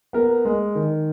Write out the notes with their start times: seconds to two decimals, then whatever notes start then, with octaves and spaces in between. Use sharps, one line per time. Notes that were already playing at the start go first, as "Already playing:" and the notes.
0.13 B3 A#4
0.45 G#3
0.75 D#3